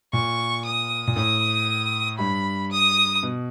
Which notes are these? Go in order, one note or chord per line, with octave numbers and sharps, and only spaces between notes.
A#2 C#6
D#6
A#2
A2 D#6
G2 B5
D#6
B2